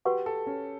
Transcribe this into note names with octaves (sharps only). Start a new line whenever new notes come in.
F#4 G4 B4 F#5 C#6
A4
C#4